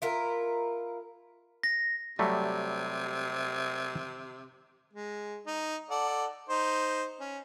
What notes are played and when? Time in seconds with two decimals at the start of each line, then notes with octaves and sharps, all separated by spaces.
0.02 E4 F4 A#4
1.63 A#6
2.19 C3 F#3 G3 A3
4.93 G#3
5.46 D#4
5.90 A4 D5 F#5
6.49 D#4 C5
7.20 C#4